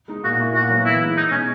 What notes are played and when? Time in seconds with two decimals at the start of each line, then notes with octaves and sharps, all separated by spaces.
0.08 G#3 D#4
0.24 A#2 F#4
0.39 A#3 E4
0.54 A#2 F#4
0.70 F#3 B3 E4
0.85 E3 E4
1.01 G#3 D#4
1.16 B2 D#4
1.32 G#3 C#4 D#4